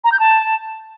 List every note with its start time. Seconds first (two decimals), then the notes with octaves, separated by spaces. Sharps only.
0.04 A#5
0.12 G6
0.20 A5